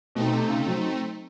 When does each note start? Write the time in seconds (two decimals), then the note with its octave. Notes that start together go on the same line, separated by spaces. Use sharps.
0.15 B2 A3 C4 D#4
0.33 C3
0.50 C#3
0.66 F#3